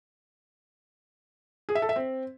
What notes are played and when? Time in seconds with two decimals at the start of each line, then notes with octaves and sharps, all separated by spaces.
1.69 G#4
1.75 E5
1.82 A4
1.89 E5
1.96 C4